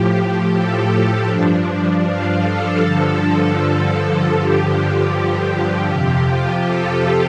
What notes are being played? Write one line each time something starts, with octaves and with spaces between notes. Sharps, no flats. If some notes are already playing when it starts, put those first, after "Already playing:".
Already playing: A2 F3 G4
A4
G4
G2 F3 D4
F4
A4
G2 D3 F3 A4
G2 D3 F3 G4
F2 C3 F3 G4
F4
A4